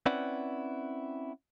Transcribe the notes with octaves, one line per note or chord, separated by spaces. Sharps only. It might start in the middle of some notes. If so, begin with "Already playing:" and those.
C4 C#4 E4 B4 D5 F#5